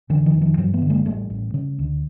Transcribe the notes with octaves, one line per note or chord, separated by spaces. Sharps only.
F1 D3 E3
D#3 F3
F1
D#3 F3
G2 E3 F#3
A3 B3
D3
G#3 A#3
A1 G3 A3
A1
C#3
D2